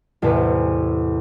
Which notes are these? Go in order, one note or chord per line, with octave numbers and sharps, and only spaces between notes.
A1 E2 C3 B4 B6